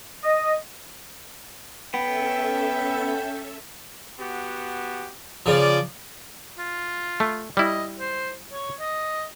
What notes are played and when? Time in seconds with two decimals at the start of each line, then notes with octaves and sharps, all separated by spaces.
0.23 D#5
1.94 B3 C#4 A4 E5 G5
4.20 B3 F#4 G4
5.46 C#3 F3 D5
6.58 F4
7.20 A3
7.57 G3 E4 D#5
7.99 C5
8.52 C#5
8.80 D#5